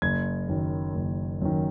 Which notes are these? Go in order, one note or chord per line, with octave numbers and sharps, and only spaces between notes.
F#1 G#6
F#2 D#3
F#1
F#2 D#3